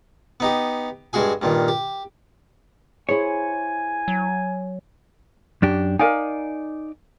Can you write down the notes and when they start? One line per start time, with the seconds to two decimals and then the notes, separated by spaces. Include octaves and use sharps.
0.40 B3 D#4 G4
1.13 G2 G#3 F#4 G#4 G#5
1.42 G2 A#2 D#3
1.68 G4
3.09 E4 G#4 C5 C#5 G#5
4.08 F#3
5.62 F#2 D4 G4
5.99 D#4 A#4 D5 F5 G#5